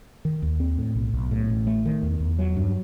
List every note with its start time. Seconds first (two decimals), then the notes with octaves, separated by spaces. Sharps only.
0.25 D#3
0.42 D#2
0.60 C4
0.78 A2
0.95 B1
1.13 B1
1.31 A2
1.50 A1
1.67 A3
1.86 D#3
2.03 E2
2.20 E2
2.39 F#3
2.57 G2